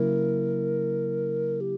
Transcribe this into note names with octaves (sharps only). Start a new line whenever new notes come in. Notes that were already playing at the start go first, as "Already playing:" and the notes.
Already playing: C#3 F#3 A#3 E4 A#4
G4